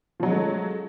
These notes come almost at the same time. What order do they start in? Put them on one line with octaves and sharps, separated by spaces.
F3 F#3 G#3 C#4 A3